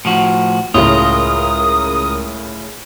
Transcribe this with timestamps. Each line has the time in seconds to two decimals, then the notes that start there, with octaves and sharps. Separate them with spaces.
0.05 A2 F3 F#4
0.74 C#2 A2 C#3 F4 A#4 D#6